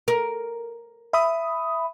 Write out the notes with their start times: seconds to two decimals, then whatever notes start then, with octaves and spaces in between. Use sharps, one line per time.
0.08 A#4
1.13 E5 B5 D#6